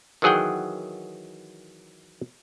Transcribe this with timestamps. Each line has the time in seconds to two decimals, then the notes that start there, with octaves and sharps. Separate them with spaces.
0.22 D#3 E3 F#3 G#4 F#5 G5